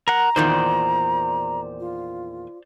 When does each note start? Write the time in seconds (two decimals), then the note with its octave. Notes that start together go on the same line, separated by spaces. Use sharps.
0.08 A#4 F#5 A#5
0.36 E2 A#2 D#3 C5 D5 G6
1.80 F4